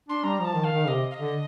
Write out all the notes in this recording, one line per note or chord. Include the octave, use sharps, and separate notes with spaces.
D4 C6
G3 A#5
F3 A5 A#5
D#3
F5
D#3
C3 D#5
F5
D#5
D3